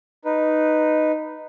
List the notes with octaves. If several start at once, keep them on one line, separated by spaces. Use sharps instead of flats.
D#4 B4